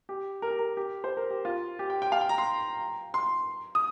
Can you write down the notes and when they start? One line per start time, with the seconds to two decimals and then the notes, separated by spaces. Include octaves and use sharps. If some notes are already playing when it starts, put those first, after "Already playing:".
0.09 G4
0.42 A#4
0.50 G4
0.59 A#4
0.77 G4
1.04 C5
1.17 A#4
1.30 G4
1.45 F4
1.79 G4
1.90 G5
2.02 G5
2.12 F5
2.21 G5
2.29 A#5
2.38 C6
3.14 C6
3.75 D#6